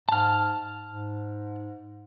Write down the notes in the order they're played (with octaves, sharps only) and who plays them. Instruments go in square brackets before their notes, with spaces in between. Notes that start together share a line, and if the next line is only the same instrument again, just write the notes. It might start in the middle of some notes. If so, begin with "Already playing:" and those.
[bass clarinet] G#2 [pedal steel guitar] A5 F6
[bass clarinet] G#2